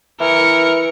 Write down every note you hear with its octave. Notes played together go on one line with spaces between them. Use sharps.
E3 A#4 C#7